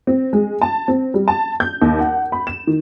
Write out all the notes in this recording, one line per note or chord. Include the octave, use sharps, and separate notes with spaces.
C4
G#3
A5
C4
G3
A5
G6
D#2
F#5
B5
E7
D#3